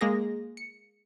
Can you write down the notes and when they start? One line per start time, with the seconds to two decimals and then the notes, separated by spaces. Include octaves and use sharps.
0.01 G#3 A#3 G#4 A#6
0.57 C#7